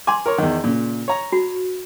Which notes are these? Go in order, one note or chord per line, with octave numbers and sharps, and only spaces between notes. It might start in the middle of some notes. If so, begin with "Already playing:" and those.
G#5 C6 D6
A#4 C#5
E2 D#3
A#2 C#3
C#5 A#5
F#4